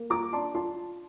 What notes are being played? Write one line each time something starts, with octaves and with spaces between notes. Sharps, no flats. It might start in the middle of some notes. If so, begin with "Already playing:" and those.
Already playing: A#3
F4 A#5 D6
D4 A5 C6
F4 A5 C6